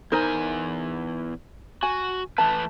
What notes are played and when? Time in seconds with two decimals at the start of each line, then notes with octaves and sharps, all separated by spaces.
0.12 E2 D#4 A#4 C5 G#5
1.83 F#4 G#5
2.38 E3 A3 B4 A5